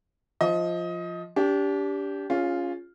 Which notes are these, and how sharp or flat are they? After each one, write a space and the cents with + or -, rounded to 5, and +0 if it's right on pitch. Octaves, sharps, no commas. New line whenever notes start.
F3 +0 D#5 +20
D4 -35 G4 +0
C#4 +5 F4 +0 G#4 -25